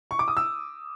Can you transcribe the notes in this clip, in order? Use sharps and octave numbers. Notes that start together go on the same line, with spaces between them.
C#6
D6
D#6
E6